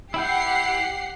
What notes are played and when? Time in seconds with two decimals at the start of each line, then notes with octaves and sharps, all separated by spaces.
0.14 E4 G4 F#5 G5 G6 C7